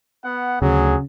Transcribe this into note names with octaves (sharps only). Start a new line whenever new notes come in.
B3 F#5
D2 C#3 F#3 G#4